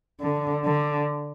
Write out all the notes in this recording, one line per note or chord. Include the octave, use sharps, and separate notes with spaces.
D3
D3